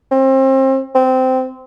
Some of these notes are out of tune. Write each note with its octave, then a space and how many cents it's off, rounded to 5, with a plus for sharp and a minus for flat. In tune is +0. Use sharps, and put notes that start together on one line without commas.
C4 +30
C4 -15